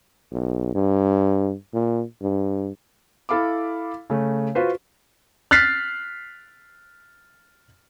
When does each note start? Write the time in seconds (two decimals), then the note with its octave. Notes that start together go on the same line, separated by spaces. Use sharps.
0.32 B1
0.75 G2
1.73 A#2
2.21 G2
3.29 E4 A4 F5 B5 D6
4.10 C#3 A3
4.55 F4 F#4 B4 C5
5.51 F6 F#6 A6 B6 C7